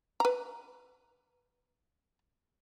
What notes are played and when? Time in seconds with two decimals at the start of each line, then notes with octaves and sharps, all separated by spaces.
0.20 B4 A#5